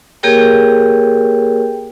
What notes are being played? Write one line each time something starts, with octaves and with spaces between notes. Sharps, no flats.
A#3 G4 G#4 A#4 C#5 G5